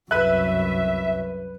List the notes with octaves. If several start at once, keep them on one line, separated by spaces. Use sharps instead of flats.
C2 F#2 B4 E5 F#6